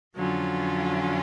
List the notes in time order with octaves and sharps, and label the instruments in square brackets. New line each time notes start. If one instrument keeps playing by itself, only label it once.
[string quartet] F2 D3 F#3 C#4 F4